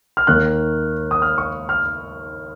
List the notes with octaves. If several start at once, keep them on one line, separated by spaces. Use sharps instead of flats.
F6
D#2 D#3 A#3 F#6
D#6
F6
C#6
F6